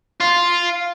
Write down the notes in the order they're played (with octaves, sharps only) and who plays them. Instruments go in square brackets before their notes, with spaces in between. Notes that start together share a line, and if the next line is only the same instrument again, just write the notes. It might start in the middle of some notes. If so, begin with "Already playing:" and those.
[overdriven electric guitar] F4